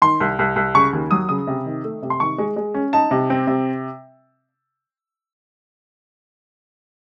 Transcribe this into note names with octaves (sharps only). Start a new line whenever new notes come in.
D#3 C6
C2
C2
C2
C#3 C#6
D#2
F#3 D#6
C#3 D#6
C3
D#3
A3
C3
C6
D#3 C#6
G#3
G#3
C#4
D#4 A5
C3
C4
C3